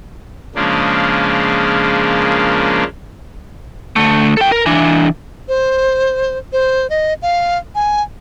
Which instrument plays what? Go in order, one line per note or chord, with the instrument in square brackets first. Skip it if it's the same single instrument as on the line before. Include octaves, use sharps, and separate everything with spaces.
[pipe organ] C#3 F3 G#3 A#3 D4
[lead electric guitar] D3 A3
A4 G5
A#4
E3 D4
[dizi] C5
C5
D#5
F5
G#5